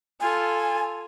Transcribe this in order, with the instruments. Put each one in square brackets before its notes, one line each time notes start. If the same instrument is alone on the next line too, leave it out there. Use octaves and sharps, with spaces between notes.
[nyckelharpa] F4 A4 [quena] G#5